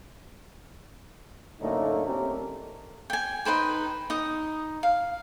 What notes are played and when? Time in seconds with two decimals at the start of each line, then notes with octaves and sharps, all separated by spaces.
1.60 F#2 A2 D3 A3 A#3 D#4
2.06 A3 C4 C#4 G4 A4 A#4
3.10 G5 G#5
3.45 D#4 B4 C5 G5
4.10 D#4 D#6
4.83 F5